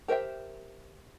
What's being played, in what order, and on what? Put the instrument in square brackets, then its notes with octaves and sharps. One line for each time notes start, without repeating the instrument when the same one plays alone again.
[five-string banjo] G4 A#4 C5 E5 G5